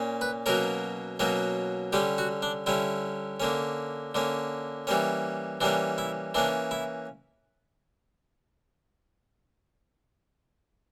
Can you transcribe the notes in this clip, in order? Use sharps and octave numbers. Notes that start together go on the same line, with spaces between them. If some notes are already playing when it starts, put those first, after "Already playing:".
Already playing: A#2 A#3 C#4
B4
B2 F#3 A#3 C#4 A#4
B2 F#3 A#3 C#4
D3 G3 C#4 G4
F#4
D4
D3 G3 C#4 E4
D3 A#3 C#4
D3 A#3 C#4
E3 G3 A#3 C#4
E3 G3 A#3 C#4 D4
E4
E3 A#3 C#4 D4
E4